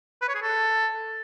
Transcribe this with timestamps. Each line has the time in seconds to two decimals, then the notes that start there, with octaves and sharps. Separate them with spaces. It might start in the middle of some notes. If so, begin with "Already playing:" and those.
0.22 B4
0.28 C#5
0.35 G#4
0.42 A4